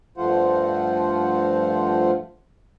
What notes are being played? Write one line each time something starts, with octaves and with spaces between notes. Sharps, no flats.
G2 F3 A3 F4 C5 F#5